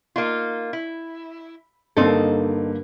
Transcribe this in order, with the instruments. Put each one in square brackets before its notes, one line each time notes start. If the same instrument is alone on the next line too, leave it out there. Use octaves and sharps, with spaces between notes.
[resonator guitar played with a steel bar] A#3 D#4 F4
E4
[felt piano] G2 D3 A#3 [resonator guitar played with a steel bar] C4 D#4 A4